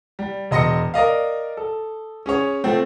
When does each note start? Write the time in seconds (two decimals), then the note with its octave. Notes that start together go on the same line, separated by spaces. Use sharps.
0.19 G3
0.51 E1 D#5 C6 A#6 C#7
0.94 A#4 D5 D#5 F5
1.57 A4
2.26 C#4 G#4 C#5
2.64 F3 A3 C4